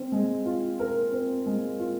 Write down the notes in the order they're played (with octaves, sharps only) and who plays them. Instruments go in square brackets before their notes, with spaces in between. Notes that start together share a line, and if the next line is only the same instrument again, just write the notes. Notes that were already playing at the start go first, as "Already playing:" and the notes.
Already playing: [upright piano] C4
G#3
F4
A#4
C4
G#3
F4